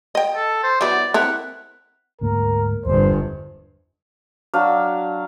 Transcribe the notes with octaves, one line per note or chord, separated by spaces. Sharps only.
D#5 G5
A4
C5
F#3 B3 E4 D5
C4 E4 A#4 F#5
D2 G#2 A#3 A#4
G1 E2 G2 G3 C4 C5
F#3 D4 F5